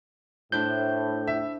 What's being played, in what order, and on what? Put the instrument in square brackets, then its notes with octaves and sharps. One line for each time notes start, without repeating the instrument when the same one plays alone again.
[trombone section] A2 [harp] D4 E4 C5 [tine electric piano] G6
[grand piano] E5